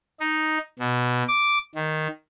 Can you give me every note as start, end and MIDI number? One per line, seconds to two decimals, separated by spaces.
0.20 0.58 63
0.79 1.23 47
1.28 1.58 86
1.75 2.08 51